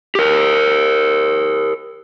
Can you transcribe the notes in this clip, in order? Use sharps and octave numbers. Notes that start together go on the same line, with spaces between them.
G4 A#4